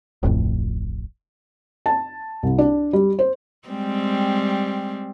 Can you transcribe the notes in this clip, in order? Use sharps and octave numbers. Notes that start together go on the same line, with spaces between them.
D1 A1 F2 A2
A5
C2
D4
G3
C5
G3 G#3 C4